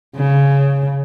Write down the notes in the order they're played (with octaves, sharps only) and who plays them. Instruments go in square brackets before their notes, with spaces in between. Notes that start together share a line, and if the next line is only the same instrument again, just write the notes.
[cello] C#3